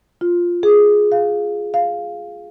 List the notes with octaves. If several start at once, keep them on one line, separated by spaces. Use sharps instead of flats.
F4
G#4
F5
F5